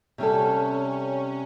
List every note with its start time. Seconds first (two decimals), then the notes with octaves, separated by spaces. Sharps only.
0.18 C3 G3 C#4 A4